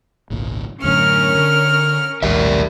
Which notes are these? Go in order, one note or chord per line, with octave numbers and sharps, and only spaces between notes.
G#1 C#2 A#2
F#2 A2 D3 C#4 A#4 F6
D3
A#1 D#2 A2 G4 A#4 E5